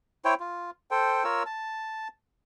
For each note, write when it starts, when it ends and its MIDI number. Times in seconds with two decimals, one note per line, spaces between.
0.25 0.34 64
0.25 0.34 72
0.25 0.34 73
0.25 0.34 79
0.40 0.71 65
0.91 1.24 69
0.91 1.24 72
0.91 1.24 79
1.24 1.43 65
1.24 1.43 70
1.24 1.43 73
1.24 1.43 88
1.46 2.08 81